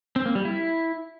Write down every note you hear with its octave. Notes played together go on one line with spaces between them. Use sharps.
C4
A#3
G3
E4